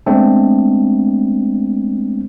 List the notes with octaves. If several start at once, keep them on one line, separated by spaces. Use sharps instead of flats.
G#3 A3 B3 C4 D4